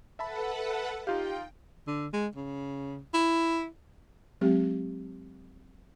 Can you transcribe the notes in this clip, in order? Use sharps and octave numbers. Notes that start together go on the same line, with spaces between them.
A4 B4 E5 F#5 A5 B5
D#4 F4 G4 F5 G5
D3
G#3
C#3
E4
F#3 G#3 C4 G4